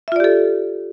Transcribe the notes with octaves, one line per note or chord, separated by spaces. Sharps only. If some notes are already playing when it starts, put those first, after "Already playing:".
F4 G4 A4 D5 E5